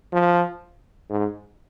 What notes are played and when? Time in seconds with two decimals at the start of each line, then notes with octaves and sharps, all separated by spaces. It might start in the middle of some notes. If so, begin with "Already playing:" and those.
0.13 F3
1.10 G#2